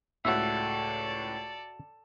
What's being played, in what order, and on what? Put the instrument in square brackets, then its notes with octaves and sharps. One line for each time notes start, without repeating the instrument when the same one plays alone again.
[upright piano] C#2 A2 [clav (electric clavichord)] F#4 E5 [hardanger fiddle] A4 D5